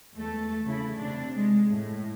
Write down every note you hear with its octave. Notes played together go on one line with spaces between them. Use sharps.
E2 A3 A4
C#3 A3 E4
C3 D4
G#3
A2